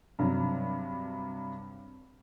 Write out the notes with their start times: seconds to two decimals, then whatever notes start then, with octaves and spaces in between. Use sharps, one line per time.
0.19 G2 C3 F#3